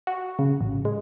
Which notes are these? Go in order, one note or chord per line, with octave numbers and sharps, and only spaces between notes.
F#4
C#3
A1
G#3